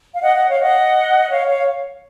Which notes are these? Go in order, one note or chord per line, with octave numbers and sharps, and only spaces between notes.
F5
D#5 F#5
D#5 F#5
C#5 F5
D#5 F#5
C#5 F5
C#5 F5